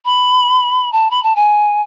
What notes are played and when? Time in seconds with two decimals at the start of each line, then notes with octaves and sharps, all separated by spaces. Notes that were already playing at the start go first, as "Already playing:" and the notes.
0.05 B5
0.92 A5
1.11 B5
1.23 A5
1.36 G#5